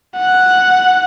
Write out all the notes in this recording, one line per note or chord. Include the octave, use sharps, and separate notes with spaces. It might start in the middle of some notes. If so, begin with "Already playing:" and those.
F#5